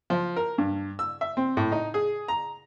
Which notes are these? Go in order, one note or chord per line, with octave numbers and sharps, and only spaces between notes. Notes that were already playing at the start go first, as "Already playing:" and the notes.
F3
A#4
G2
E6
E5
C4
A2
D#4
G#4
A#5